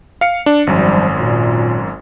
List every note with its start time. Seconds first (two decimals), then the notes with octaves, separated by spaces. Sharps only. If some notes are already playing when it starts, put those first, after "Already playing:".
0.21 F5 C#7
0.46 D4
0.67 G#1 F#2 F3 G3
1.19 A#2